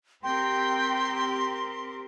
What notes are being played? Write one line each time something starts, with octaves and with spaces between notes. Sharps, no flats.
C4 G4 A#4 G5 C6